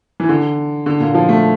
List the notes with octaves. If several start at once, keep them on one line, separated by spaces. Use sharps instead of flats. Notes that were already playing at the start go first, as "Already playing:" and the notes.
E3
D3
D3
A#2
F3
A3